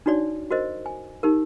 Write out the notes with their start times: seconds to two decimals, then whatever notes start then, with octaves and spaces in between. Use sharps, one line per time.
0.06 D4 D#4 F#4 C#5 D5
0.51 F#4 A#4 C5 D#5
0.86 G#5
1.23 D#4 G4 A#4